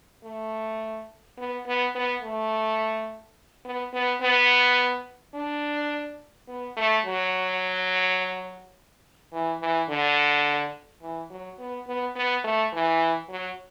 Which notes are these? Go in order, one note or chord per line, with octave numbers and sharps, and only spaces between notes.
A3
B3
B3
B3
A3
B3
B3
B3
D4
B3
A3
F#3
E3
E3
D3
E3
F#3
B3
B3
B3
A3
E3
F#3